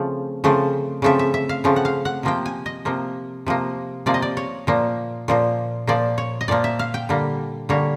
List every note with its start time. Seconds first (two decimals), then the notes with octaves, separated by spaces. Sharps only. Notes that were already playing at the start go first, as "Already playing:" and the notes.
Already playing: C#3 F3 A3 C4
0.44 C#3 F3 A3 C4
1.02 C#3 F3 A3 C4 E5
1.19 E5
1.34 E5
1.49 F5
1.64 C#3 F3 A3 C4
1.76 F#5
1.85 F5
2.05 F#5
2.23 C3 F3 A#3 G5
2.46 G#5
2.66 D#5
2.85 C3 F3 A#3
3.46 C3 F3 A#3
4.06 C3 F3 A#3 D5
4.14 D#5
4.22 D5
4.37 C#5
4.67 A#2 F3 A#3
5.28 A#2 F3 A#3
5.87 A#2 F3 A#3 D5
6.18 C#5
6.41 D#5
6.48 A#2 F3 A#3 D5
6.64 E5
6.79 F5
6.94 G5
7.09 D3 G3 A#3
7.69 D3 G3 A#3 C#5